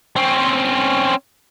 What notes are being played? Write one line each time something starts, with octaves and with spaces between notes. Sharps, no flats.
C4 C#4